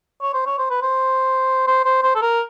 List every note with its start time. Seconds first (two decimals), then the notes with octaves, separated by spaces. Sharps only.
0.22 C#5
0.33 C5
0.46 C#5
0.59 C5
0.70 B4
0.82 C5
1.67 C5
1.85 C5
2.03 C5
2.15 A4
2.22 A#4